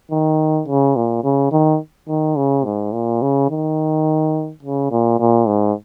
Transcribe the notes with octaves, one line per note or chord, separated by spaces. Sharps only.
D#3
C#3
A#2
C#3
D#3
D#3
C#3
G#2
A#2
C#3
D#3
C#3
A#2
A#2
G#2